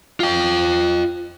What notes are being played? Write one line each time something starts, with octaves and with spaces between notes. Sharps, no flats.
F4 G5